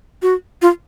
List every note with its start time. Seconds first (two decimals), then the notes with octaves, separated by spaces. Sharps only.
0.22 F#4
0.62 F4